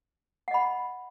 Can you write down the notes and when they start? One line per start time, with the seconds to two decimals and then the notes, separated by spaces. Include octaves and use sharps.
0.48 F#5
0.51 D#5
0.54 B5